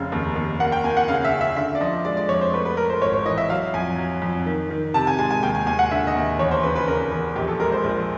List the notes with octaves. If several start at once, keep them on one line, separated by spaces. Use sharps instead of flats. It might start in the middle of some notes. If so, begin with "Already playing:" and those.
Already playing: F1 C#3 F5
D#2
D#2
A#3 F#5
G5
A#3 G#5
F#5
C#3 F5
E5
C#3
E5
D3 E5
D5
F3 D#5
G#3 D5
D5
F2 C#5
C5
A3 B4
B4
A3 A#4
C5
G#1 C#5
C#5
E3 D#5
E5
F#3 F5
F2 G#5
F#3
F2
D#3
D#3
C3 A5
G#5
G#3 G#5
G#5
D#2 G5
G#5
D#2 G#5
F#5
D3 E5
D#5
D#2
E2 C#5
C5
C#3 B4
B4
C#3 A#4
E2
A#1 G4
A4
G#3 A#4
C5
A#1